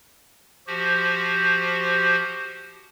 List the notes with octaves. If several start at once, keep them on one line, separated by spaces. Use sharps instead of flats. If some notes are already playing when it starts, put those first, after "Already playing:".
F3 F#4 G4 C5